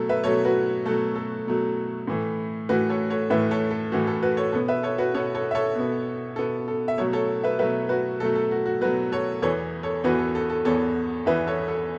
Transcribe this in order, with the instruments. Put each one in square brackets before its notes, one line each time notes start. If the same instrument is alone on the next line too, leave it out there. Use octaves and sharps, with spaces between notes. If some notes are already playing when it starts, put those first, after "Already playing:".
Already playing: [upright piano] B2 F#3 A3 A4
B4 E5
B2 F#3 A3 A4 C#5
F#4 B4
B2 F#3 A3 A4
A4
B2 F#3 A3
A2 E3 A3
A2 E3 A3 F#4 B4
A4 C#5
A4 C#5
A2 E3 A3 B4 E5
A4 C#5
A4
A2 E3 A3 F#4
A4
F#4 B4
A4 C#5
B2 B3 A4 C#5
B4 E5
A4 C#5
F#4 B4
B2 B3 A4 C#5
A4 C#5
E5
A4 C#5
B2 B3
B2 B3 A4
A4
E5
B2 F#3 A3 A4 C#5
A4 C#5
B4 E5
B2 F#3 A3 B4 E5
F#4 B4
B2 F#3 A3 A4
A4
F#4
F#4
B2 F#3 A3 F#4 B4
A4 C#5
E2 E3 B3 A4 C#5
A4 C#5
E2 E3 B3 F#4 B4
A4
A4
A4
E2 E3 B3 A4 C#5
E2 E3 B3 B4 E5
A4 C#5
A4